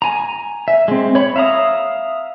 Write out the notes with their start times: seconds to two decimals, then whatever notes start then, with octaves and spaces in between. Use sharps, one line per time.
0.02 G#5 A#5
0.68 E5
0.88 G#3 C4
1.15 C#5 B5
1.36 E5 F5 A#5 D#6